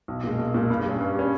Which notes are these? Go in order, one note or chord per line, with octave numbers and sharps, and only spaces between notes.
B1
A#2 G#3
B1
A#2 G#3
G2
G3 C#4
G2
G3 C#4